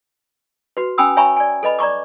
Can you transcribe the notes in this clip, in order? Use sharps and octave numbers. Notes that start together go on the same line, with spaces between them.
F#4 B4
C#4 G5 G#5 B5 D#6 E6
C#5 E5 G#5 A#5 B5 C#6
D5 G#5
A4 B4 D#5 B5
D5 A#5 C#6 D6